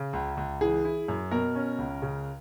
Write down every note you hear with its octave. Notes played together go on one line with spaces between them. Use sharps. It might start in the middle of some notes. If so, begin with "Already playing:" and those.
Already playing: C#3
C#2
C#2
E3 G#4
E4
F#2
B2 A#4
C#4
C#2
C#3